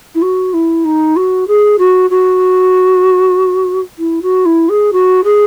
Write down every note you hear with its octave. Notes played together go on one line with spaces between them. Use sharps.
E4
F#4
E4
D#4
F#4
G#4
F#4
F#4
E4
F#4
E4
G#4
F#4
G#4